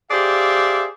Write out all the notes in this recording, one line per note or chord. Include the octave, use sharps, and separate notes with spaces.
G4 G#4 C5 D5 E5 F5